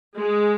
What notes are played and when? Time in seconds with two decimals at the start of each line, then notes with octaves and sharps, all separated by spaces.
0.17 G#3